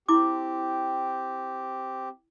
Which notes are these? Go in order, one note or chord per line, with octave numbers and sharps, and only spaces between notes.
C4 E4 G4 C6 D6